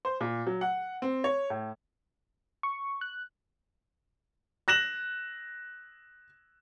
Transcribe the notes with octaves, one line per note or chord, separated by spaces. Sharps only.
C5
A#2
F#3
F#5
C4
C#5
A2
C#6
F#6
F#6 A#6 E7 F#7